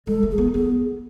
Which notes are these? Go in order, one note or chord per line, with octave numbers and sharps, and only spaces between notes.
G#3 A4
A3
G#4
B3
B3 G#4